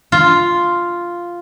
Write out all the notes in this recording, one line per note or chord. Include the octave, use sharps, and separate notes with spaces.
F4